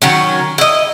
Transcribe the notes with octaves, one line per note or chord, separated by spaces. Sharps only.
D#3 F#3 C#4
E4 D#5